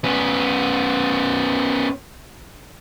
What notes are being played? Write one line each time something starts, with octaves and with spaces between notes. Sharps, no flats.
B3 C#4